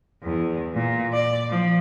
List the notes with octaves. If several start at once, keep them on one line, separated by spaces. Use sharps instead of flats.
E2
A#2
D5
F3